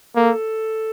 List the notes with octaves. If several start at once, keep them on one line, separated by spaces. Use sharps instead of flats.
A#3 A4